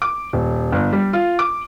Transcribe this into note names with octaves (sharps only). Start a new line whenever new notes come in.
D6
D#1
G1
G3
F4
D6